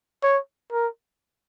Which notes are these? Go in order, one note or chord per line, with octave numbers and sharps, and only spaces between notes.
C#5
A#4